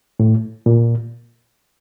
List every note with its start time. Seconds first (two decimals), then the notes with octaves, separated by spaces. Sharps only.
0.20 A2
0.66 A#2